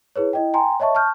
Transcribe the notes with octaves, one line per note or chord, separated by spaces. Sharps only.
E4 G#4 B4 C#5
E4 D#5 G5
G5 G#5 A#5 C6
C#5 D#5 E5 A5 C#6
A5 C#6 F6 G6